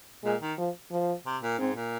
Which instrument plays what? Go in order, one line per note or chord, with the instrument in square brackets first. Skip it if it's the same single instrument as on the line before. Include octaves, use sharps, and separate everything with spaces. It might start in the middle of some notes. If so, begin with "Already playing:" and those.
[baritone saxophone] A#2 [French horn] G#3
[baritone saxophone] D#3
[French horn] F3
F3
[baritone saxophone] C3
A#2
[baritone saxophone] G#2 [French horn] C4
[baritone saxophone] A#2